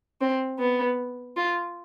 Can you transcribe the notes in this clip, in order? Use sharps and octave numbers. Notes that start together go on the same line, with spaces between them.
C4
B3
F4